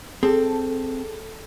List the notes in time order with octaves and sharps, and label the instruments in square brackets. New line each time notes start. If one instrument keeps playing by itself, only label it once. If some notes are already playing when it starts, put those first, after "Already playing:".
[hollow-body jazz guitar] C4 [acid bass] G#4 [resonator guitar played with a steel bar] A4